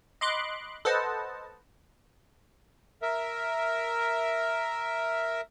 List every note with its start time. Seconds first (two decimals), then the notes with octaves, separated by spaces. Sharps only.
0.21 D#5 B5 C6 D6 F#6
0.85 A4 B4 C5 D#5 F#5 A5
3.02 A#4 E5